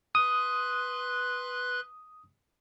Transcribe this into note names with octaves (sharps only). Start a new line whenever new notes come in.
B4 C6 D#6 F#6